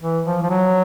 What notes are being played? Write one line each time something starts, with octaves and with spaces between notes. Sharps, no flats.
E3
F3
F3
F#3